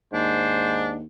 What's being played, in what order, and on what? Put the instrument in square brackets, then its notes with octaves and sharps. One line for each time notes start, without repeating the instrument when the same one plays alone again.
[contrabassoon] D#2 [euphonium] G#2 [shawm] D4 [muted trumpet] C5